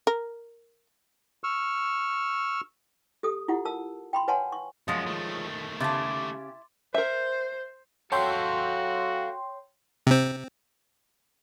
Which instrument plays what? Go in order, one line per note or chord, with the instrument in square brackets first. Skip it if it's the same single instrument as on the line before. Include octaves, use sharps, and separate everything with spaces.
[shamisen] A#4
[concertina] C#6 E6 F6
[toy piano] G4 A4 D#6
E4 F4 G4 F#5
A#4 A5 E6
G5 B5 C6
B4 C#5 F#5 G#5 A5 C6
C#6
[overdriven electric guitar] F#2 [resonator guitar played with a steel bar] F3 G#3 [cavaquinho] F4 C#5 [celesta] D#6
[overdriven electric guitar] D#3 A3
[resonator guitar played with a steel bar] C#3 G4 [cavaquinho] E4 A5 [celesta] C6 D6 A6
[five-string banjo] A#4 E5 [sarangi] C5
[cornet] F#4 [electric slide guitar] A4 F5 A5 [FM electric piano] C#5 G5 C6
[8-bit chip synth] C3 C4